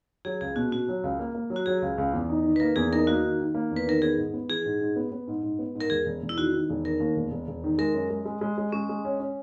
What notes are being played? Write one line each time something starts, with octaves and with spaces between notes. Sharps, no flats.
F#3 G#4
C#2 G#4
B2 F#4
B2 F#4
F#3
C#2
A#3
A#3
F#3
F#4
F#3 G#4
C#2
C#2
E2
D#4
D#3
B4
A#3 A#4
E2 G#4
D#4 A#4
A#3 F#4
D#3
D#3
A#3
E2
B4
D#3 A#4
B3 G#4
G#2
B3
E3 G#4
G#2
G#2
B3
B3
G#2
G#2
B3
G#2
A#4
E1 G#4
E1
E1
E4
D#3 F#4
D#3
E1
D#3 A#4
D#2
E1
E1
E1
D#3
G#3 A#4
F#2
G#3
G#3
G#3
G#3
G#3 C#4
G#3
C#4
C#4